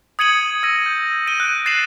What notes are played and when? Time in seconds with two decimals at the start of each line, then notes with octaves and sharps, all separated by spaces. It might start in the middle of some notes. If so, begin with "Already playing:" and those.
0.19 D#6 G#6 C#7 D#7 F#7
0.63 E6 G#6 A#6 D#7
0.86 G6
1.26 A#6 D7 D#7 G7
1.40 F#6 D7
1.66 A6 C7 D#7 E7 F#7